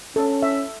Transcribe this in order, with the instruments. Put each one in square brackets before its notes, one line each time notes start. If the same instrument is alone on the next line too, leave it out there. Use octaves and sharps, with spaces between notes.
[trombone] C#4 [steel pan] A4
[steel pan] E5